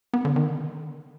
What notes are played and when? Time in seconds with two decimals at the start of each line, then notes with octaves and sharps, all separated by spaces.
0.14 B3
0.25 D3
0.36 D#3